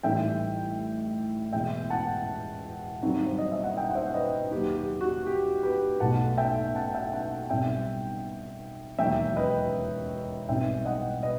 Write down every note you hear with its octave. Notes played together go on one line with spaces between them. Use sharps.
A1 A2 E3 G3 D#4 E5 G5
E1 E2 B2 E5 G5
F#5 A5
G2 D#3 F#3 C4
C5
D#5
E5
F#5
E5 G5
F#5
C5 E5
B4 D#5
D#2 D#3 F#3 G4 B4
G4
F#4
G4
G4 B4
B1 B2 F#3 A3 F#5 A5
E5 G5
F#5 A5
E5 G5
F#5 A5
B1 B2 G3 C4 E5 G5
E1 D#2 D#3 F#3 E5 G5
B4 D#5
B1 B2 G3 C4 D#4 E5 G5
D#5 F#5
B4 D#5